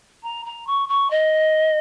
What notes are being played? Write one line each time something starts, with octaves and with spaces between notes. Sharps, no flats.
A#5
A#5
C#6
C#6
D#5